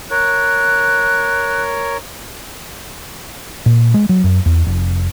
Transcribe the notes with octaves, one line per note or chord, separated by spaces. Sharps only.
A#4 C#5 F#6
A#2
G#3
F#3
F#2
E2
F1